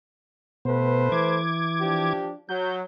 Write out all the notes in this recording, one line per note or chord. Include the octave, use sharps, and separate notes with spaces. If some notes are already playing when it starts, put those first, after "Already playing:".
B2 A3 B3 B4 C5
E3 D6 G#6
F3 D4 G4
F#3 G6